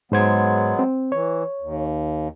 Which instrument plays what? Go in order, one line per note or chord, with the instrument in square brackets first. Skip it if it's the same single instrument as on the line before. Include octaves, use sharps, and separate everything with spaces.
[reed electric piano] G#2 C5 G#6 [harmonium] F#3 G#3 B3
[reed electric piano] C4
[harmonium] E3 [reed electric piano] C#5
[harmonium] D#2